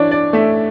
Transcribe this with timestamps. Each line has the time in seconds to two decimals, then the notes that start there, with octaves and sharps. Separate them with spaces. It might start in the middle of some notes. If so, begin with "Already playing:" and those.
Already playing: E3 D4 C#5 D5
0.11 D5
0.33 A3 E5